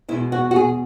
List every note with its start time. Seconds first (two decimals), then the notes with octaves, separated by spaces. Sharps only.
0.08 E2 B2 G#3 E4
0.32 F#4
0.51 F#4
0.56 G#4